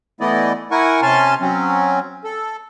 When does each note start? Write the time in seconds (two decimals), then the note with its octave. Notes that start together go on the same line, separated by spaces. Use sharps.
0.21 E3 A3 B3 E4 D5 D#5
0.71 E4 A#4 F#5 G#5 C#6
1.02 C3 C#4 G#5 A5 C6 F6
1.41 F#3 C4 C#4
2.24 A4